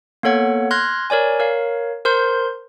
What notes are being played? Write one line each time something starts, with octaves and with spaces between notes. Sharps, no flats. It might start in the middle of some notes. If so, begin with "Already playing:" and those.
A#3 B3 A4 C#5 F#5
C6 F6 F#6 G#6 A#6
A#4 C#5 D5 G#5
A#4 C#5 F5
A#4 C5 C6 G6